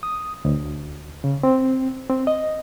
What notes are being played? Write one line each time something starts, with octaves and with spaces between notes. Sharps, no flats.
D#6
D2
C#3
C4
C4
D#5